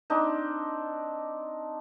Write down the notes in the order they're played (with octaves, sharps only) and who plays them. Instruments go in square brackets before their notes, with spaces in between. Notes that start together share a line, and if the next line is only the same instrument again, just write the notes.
[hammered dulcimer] C4 D4 D#4